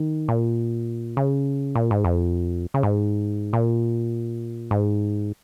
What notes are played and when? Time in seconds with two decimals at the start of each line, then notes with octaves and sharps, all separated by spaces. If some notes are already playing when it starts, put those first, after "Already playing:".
Already playing: D#3
0.28 A#2
1.17 C#3
1.75 A#2
1.91 G#2
2.05 F2
2.74 C#3
2.83 G#2
3.53 A#2
4.71 G#2